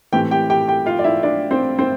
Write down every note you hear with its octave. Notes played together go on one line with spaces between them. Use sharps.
A2 E3 A3 C4 G4 G5
G4 G5
G4 G5
G4 G5
F4 F5
D5
E4 E5
D4 D5
C4 C5
C4 C5